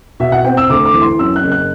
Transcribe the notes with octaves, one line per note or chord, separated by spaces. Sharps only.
B2 E5
F#5
C4 G5
E6
D2 D6
D6
E3
C6
F#2 E6
F#6
F#1
F#6